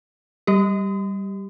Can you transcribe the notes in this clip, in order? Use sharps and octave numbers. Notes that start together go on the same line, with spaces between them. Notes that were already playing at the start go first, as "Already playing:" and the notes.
G3 G4